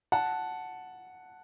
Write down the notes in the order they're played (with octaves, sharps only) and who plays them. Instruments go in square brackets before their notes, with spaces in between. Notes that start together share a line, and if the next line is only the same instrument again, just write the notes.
[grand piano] F#5 A5